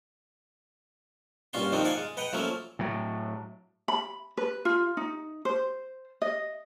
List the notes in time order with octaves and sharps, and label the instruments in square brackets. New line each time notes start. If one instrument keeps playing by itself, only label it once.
[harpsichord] G2 A#2 C#4 F4 F#4 C6
D#3 F3 A#3 C4 D4 D#4
A#4 D5 D#5 F5 F#5 G#5
G#3
B4 D#5 F#5 G5 A#5
F3 F#3 A3 A#3 C#4
[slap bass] A2 F#3
[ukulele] B5
B4
F4
D#4
C5
D#5